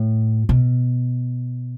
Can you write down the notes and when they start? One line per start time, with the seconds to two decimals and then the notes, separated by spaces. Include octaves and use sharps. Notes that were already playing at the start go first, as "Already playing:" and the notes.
Already playing: A2
0.49 B2